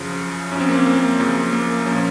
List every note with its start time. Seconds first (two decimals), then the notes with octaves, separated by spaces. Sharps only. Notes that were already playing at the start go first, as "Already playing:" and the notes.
Already playing: F#2 C#3 F3
0.52 F#2 C#4
0.55 F3
0.60 C4
0.69 A#3
0.77 C4
0.86 A#3
1.20 F#2 C#3 F3
1.53 A#3
1.86 A#2 F3 C#4